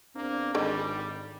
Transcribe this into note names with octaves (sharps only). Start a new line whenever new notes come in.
E2 A#3 C4 D4
G#1 D3 D#3 G3 G#3